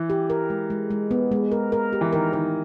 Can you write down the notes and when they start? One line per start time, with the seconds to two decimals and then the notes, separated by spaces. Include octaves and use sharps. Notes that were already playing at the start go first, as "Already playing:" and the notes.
Already playing: E3
0.10 G4
0.30 A#4
0.50 G#3
0.70 G#3
0.91 G#3
1.11 B3
1.32 G#3
1.52 A#4
1.72 A#4
1.93 G4
2.01 E3
2.13 D#3 A#4
2.33 D#3 A#4